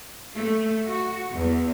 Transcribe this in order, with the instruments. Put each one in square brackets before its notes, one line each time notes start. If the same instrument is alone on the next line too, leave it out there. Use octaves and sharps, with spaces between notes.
[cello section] A3
F#4
E2